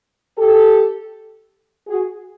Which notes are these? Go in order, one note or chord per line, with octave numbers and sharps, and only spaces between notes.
G4 A4
F#4 G#4